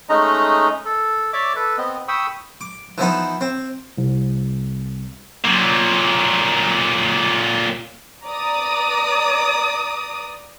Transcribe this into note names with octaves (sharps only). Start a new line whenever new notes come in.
G#3 A3 C#4 D#4 D#5 A#5
A4
C#5 D5 E5 D6
A4 B4
B3 C4 D#5
G5 B5 C#6 D#6 E6
D6
E3 F3 B3 D#4
C4
C2
A#2 F#3
B4 D5 A#5 D6 D#6